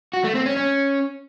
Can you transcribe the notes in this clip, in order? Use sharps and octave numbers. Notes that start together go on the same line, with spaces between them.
F#4
A3
C4
C#4
C#4